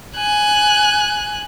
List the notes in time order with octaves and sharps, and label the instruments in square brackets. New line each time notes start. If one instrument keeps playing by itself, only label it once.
[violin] G#5 F#6